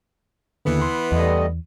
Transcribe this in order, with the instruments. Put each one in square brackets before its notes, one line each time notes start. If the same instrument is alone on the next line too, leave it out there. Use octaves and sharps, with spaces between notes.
[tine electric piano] D#2 D3 [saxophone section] E3 B3
[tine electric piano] C6
[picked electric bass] E2 [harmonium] G3 A3 D#5